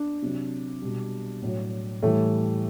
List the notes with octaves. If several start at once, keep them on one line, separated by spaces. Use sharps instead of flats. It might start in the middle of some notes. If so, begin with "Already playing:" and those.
Already playing: D4
C3 F#3
B2 G3
A2 F#3
A2 E3 G3 A3